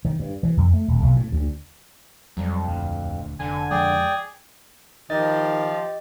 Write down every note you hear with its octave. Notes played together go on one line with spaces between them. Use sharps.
D#3
G2
E3
F2
A3
D#1
B1
A2
D2
F2 F#3 G3
D#1 D2
F1 D3 G#5
F2 F3 G#3 G#4 D5 G5
D#3 F3 G4 D#5 A6